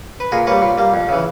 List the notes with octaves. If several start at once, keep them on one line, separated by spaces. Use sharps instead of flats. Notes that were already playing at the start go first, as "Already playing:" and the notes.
B4
A#2 G#4 A#4
G3 A#3 B4 C#5
A#2
G3 A#3
F2
C#3 E3